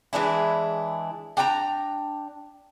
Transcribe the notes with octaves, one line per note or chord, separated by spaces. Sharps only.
E3 G#3 D4 E4
D4 G5 G#5 A#5